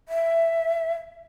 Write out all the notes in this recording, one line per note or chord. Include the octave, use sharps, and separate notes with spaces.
E5